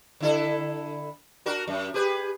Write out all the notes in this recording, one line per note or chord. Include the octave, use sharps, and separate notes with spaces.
D3 E4 A4
D4 F#4 A#4
F#2
G4 G#4 B4